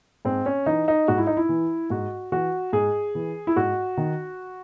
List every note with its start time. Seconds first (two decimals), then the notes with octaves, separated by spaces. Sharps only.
0.25 G#2 C4
0.46 C#4
0.66 E3 D#4
0.88 D#4
1.08 G#2 F#4
1.18 E4
1.27 D#4
1.37 E4
1.49 E3
1.90 G#2 F#4
2.32 E3 F#4
2.73 G#2 G#4
3.15 E3
3.47 E4
3.56 G#2 F#4
3.97 D#3